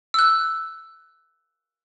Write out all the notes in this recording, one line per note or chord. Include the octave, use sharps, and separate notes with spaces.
E6 F#6